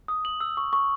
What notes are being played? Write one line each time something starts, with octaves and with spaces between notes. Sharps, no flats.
D#6
F#7
E6
C#6
C#6